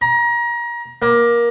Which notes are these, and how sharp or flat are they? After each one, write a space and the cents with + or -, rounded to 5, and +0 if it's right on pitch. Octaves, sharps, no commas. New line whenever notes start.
A#5 +30
A#3 +20